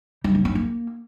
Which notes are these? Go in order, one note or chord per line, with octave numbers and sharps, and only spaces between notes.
G3
A#3
C#4
A#3